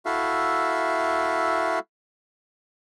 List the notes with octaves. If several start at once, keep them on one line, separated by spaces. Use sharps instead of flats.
E4 F#4 A4 E5 F5